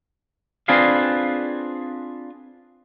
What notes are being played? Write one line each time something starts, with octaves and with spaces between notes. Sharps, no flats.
C4 D4 F4 G#4 B4 F5